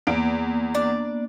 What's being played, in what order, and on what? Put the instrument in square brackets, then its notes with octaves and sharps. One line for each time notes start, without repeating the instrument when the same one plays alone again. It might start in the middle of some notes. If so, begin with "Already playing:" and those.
[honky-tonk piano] E2 D7 [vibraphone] A#3 B3
[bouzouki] D4 D5